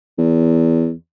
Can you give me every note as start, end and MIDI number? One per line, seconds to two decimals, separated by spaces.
0.19 0.93 40